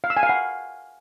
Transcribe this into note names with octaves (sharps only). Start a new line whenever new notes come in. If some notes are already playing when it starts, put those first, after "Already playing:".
F5
E6
G#5
F5
F#5